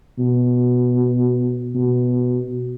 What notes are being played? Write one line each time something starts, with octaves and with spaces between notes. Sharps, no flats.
B2
B2